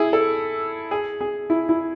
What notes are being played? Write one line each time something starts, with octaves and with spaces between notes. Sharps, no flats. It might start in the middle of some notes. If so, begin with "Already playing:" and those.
Already playing: E4 G#4
A4
G#4
G#4
E4
E4